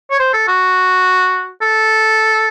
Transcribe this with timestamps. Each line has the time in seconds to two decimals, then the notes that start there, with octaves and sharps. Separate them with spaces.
0.11 C#5
0.19 C5
0.33 A4
0.48 F#4
1.62 A4